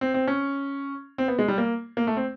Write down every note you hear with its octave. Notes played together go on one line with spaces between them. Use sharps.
C4
C4
C#4
C4
B3
G#3
G3
A#3
A#3
A3
C4